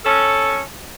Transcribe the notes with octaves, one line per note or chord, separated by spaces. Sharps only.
C#4 A4